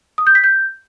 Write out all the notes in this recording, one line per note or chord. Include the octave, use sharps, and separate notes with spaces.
D#6
G6
B6
G6